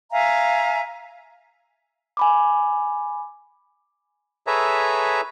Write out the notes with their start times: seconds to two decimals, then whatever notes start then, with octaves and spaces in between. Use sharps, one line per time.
0.11 E5 F5 G#5 A#5
2.17 G#5 B5 D6
4.47 G#4 A4 B4 C#5 E5 A#5